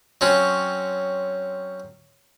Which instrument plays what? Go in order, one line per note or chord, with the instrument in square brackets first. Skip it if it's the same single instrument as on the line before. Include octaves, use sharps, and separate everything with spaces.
[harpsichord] F#3 C4 C#4